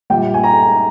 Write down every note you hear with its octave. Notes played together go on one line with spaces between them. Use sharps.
A#1 A#2 G3 G5
G#5
A#5